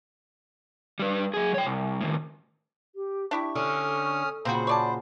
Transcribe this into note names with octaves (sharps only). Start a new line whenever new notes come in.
G3 B4
F#3 G#4
C#5 G5
C2
A2 D#3
G4
D4 E4 G4 C#6
D3 C#4 D#6 F6
A#2 C#3 C4 F#4 C5 B5
C#5 D5 A5